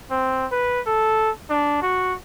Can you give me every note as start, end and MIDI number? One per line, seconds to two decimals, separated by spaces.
0.11 0.46 60
0.52 0.81 71
0.87 1.30 69
1.50 1.81 62
1.82 2.15 66